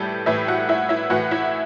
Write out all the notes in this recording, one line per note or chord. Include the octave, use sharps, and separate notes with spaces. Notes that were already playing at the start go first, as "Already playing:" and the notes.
Already playing: A2 E3 G3 G4 A4
A2 E3 E4 E5
F#4 F#5
E4 E5
E4 E5
A2 E3 F#4 F#5
E4 E5